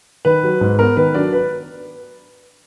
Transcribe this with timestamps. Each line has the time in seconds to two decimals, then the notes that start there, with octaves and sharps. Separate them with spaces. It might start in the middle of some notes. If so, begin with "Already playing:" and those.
0.25 D#3 B4
0.43 F#3
0.61 G#2
0.79 B3 A#4
0.97 D#3 B4
1.14 F#3 D4 D5
1.33 B4